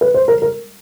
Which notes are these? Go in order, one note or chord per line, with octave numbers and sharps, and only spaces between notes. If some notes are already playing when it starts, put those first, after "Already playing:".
B4
C5
A#4
A#4